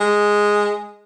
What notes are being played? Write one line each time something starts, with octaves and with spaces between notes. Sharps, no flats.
G#3